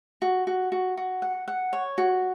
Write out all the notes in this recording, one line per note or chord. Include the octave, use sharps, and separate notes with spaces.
F#4
F#4
F#4
F#4
F#5
F#5
C#5
F#4